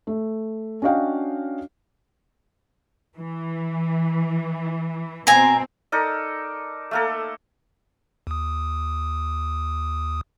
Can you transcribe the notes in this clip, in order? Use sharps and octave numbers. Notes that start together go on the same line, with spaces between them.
A3
C#4 D4 F#4 D#5 F5 G5
E3
B2 C4 G#5 A#5
D#4 A4 A#4 D5
A3 A#3 A4
D#2 D#6